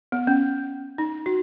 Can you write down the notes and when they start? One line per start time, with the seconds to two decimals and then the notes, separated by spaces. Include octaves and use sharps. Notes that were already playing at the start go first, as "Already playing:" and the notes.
0.12 B3
0.27 C#4
0.98 D#4
1.26 F#4